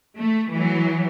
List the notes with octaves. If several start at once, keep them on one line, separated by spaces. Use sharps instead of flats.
A3
E3 F#3